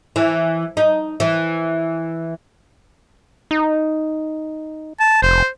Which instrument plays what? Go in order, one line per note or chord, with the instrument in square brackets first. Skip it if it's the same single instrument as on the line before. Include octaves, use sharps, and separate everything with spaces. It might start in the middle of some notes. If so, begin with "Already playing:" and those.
[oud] E3
D#4
E3
[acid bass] D#4
[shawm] A5
[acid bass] F1 [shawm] C5